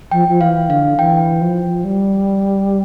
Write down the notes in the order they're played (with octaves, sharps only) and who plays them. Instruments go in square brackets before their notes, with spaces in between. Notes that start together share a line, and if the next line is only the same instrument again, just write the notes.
[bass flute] F3 [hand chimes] G5
[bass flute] F3
[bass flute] E3 [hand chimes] F5
[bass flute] D3 [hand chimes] F5
[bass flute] E3 [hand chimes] G5
[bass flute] F3
G3